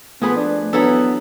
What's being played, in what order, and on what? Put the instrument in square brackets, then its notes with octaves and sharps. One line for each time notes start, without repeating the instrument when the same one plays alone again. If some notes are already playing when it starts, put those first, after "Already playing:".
[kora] F3 G#4 B4 [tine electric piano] A3 [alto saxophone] B3
[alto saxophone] D4
[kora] E3 F#3 A4 [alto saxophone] B3 [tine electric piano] D4